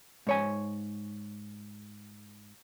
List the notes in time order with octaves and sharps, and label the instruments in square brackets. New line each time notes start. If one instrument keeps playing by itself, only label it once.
[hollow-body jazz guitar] G#2 C#5 G#5